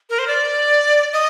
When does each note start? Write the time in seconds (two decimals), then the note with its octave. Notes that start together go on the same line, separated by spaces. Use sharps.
0.10 A#4
0.19 C5
0.28 D5
1.13 D#5